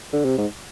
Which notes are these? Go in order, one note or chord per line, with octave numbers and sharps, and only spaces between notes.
D3
C3
G#2